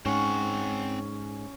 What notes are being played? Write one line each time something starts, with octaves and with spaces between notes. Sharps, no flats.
G#2 C4 C#4 F#5